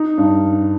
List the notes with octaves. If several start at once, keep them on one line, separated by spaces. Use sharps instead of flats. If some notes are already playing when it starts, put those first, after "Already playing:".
Already playing: D#4
G2